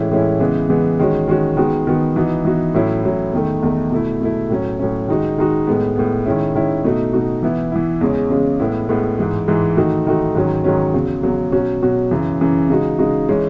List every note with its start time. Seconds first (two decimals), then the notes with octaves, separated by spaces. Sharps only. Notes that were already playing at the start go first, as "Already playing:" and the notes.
Already playing: A2 E3 G#3 C#4 E4
0.11 A2 E3 G#3 C#4 E4
0.40 C#3 E3 G#3 B3
0.69 C#3 E3 G#3 B3
0.99 D#3 G#3 C#4 F#4
1.28 D#3 G#3 C#4 F#4
1.57 D#3 G#3 B3 F#4
1.87 D#3 G#3 B3 F#4
2.16 E3 B3 D#4 F#4
2.45 E3 B3 D#4 F#4
2.74 A2 F#3 C#4 E4
3.04 A2 F#3 C#4 E4
3.33 E2 D#3 A3
3.63 E2 D#3 A3
3.91 B2 A3 E4
4.21 B2 A3 E4
4.50 A2 F#3 C#4
4.79 A2 F#3 C#4
5.08 D#3 G#3 D#4 F#4
5.38 D#3 G#3 D#4 F#4
5.67 A2 G#3 B3
5.96 A2 G#3 B3
6.26 D#3 G#3 C#4 E4
6.55 D#3 G#3 C#4 E4
6.84 B2 A3 D#4 F#4
7.13 B2 A3 D#4 F#4
7.43 E3 B3 E4
7.72 E3 B3 E4
8.01 E2 C#3 G#3 C#4
8.30 E2 C#3 G#3 C#4
8.59 A2 G#3 B3 E4
8.89 A2 G#3 B3 E4
9.19 G#2 E3 G#3
9.48 G#2 E3 G#3
9.77 D#3 A3 D#4 F#4
10.07 D#3 A3 D#4 F#4
10.35 G#2 D#3 F#3 C#4
10.64 G#2 D#3 F#3 C#4
10.94 E2 C#3 F#3
11.23 E2 C#3 F#3
11.52 B2 F#3 C#4 F#4
11.82 B2 F#3 C#4 F#4
12.11 F#2 C#3 E3
12.41 F#2 C#3 E3
12.70 C#3 G#3 D#4 F#4
12.98 C#3 G#3 D#4 F#4
13.29 E3 G#3 C#4